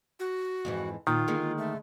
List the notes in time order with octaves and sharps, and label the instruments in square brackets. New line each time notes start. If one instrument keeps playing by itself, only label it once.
[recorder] F#4
[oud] F2 G#2 E3
[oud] A#2 [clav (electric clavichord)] D#3 [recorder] F4
[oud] D3 G#3 A#3
[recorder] A3